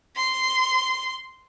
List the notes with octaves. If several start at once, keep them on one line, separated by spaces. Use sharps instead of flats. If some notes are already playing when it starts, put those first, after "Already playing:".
C6